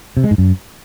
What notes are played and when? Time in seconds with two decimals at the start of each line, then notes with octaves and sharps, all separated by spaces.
0.17 C3
0.24 G#3
0.31 G#2
0.38 F#2